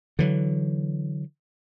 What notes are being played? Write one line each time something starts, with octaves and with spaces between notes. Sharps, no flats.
D3 E3 F#3